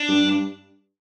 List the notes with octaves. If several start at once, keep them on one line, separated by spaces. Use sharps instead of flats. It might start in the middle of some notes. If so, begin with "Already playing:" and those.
Already playing: D4
G2
G2